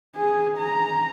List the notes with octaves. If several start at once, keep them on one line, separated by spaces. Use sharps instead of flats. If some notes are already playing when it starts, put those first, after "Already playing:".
G#4
A#5